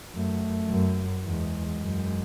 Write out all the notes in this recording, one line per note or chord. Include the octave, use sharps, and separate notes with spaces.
F#2 A3
F#2
E2 G#3
F#2